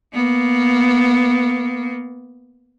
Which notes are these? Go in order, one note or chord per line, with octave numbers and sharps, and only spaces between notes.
A#3 B3